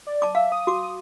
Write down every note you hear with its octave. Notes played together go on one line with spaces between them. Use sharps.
D5
A5 D6
E5 F5
D#6
F#4 D6